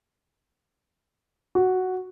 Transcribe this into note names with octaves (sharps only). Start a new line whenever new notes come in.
F#4